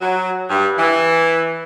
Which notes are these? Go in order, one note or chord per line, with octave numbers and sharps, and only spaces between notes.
F#3
G2
E3